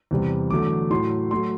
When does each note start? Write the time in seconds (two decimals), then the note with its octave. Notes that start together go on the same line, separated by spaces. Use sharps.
0.11 E2 C3 G3
0.50 E2 D3 F#3 A3 D6
0.90 A2 F#3 A3 C6
1.31 F#3 A3 C6